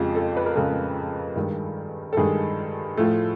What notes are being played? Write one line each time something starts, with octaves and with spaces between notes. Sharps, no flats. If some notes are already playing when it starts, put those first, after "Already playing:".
Already playing: F2 C#3 F3 G#3 G4
A4
B4
A#4
F2 C#3 F3 G#3 A4
G2 D#3 G#3
A4
G2 D#3 G#3 G#4
A2 F3 A3